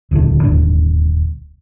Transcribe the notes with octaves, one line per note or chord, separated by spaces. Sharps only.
D#1 C#2 A#2 D3
D#1 G#1 D2 D4